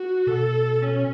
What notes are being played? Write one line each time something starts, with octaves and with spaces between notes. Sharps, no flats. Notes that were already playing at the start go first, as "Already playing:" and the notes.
Already playing: F#4
B2 A4
C#4